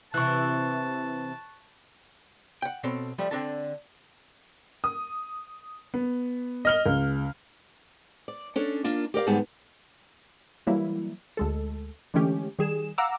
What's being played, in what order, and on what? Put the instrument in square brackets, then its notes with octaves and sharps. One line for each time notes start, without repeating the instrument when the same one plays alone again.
[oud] C3 E3 [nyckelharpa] A5 [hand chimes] C#6 F#6
[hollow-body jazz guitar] F#5 G5
B2 C4 A4 C#5
F3 G3 A3
D3 C4 D4 G4 A4 A5
[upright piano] D#6
B3
D#5 F6 G7
C#2
[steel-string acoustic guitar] D5
C#4 D4 A4
A#3 D4 F4
G4 A#4 D5 F5
D#2 G#2 G3 B3 G#4 A5
[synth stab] E3 F#3 G3 A#3 E4
D2 G#3 A4
D3 E3 G#3 A3 C#4 G4
D#3 G3 G#4 E7
F5 F#5 A#5 D6 E6